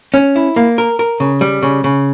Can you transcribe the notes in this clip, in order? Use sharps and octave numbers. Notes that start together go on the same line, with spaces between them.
C#4
E4
A#3
A#4
A#4
C#3
G3
C#3
C#3